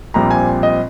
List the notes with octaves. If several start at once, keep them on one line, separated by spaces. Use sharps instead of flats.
A#1 A#2 G3 C4 A#5
G#5
D#5